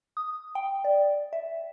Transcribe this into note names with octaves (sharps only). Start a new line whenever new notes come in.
D#6
G5
D5
E5